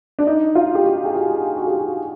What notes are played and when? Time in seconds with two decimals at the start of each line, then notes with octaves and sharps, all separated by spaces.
0.19 D4
0.27 D#4
0.55 F4
0.75 G4
0.85 F#4
1.05 G#4
1.14 G4
1.57 F#4
1.67 G4
1.74 F#4